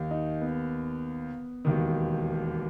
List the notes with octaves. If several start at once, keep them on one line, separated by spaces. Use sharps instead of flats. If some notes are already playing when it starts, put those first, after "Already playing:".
Already playing: D#2 D#3
D#4
B3
E1 D#2 D#3